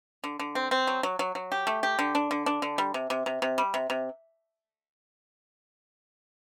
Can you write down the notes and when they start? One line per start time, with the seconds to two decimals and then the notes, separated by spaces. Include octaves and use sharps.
0.24 D3
0.39 D3
0.55 C4
0.71 C4
0.87 F#3
1.03 F#3
1.19 F#3
1.35 F#3
1.52 G4
1.67 A3
1.83 G4
1.99 D3
2.15 D4
2.31 D3
2.46 D4
2.62 D3
2.78 G3
2.94 C3
3.10 C3
3.26 C3
3.42 C3
3.58 G3
3.74 C3
3.90 C3